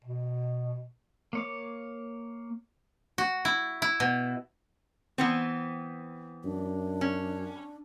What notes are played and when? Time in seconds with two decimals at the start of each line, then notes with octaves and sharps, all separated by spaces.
0.04 B2
1.33 A#3 C#5 D6
3.18 F#4
3.45 E4
3.82 E4
4.00 B2
5.18 E3 B3 C4
6.44 F#2 D4
7.01 C#4